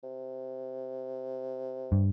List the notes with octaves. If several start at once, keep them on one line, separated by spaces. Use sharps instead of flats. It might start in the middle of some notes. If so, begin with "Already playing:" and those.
C3
G2